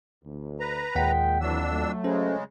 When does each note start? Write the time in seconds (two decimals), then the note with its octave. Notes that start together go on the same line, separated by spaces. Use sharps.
0.24 D2
0.60 B4 A#5
0.95 D#2 A#2 G#3 F#5 G5 B6
1.41 F2 E3 F#3 D4 E6
1.71 F#3 A3
2.04 C#3 G#3 C#4 A4 C5